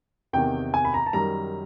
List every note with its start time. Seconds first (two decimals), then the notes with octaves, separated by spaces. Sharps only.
0.33 E2 C3 D#3 G5
0.74 G#5
0.85 B5
0.94 A#5
1.06 A5
1.13 F#2 D#3 G3 A#5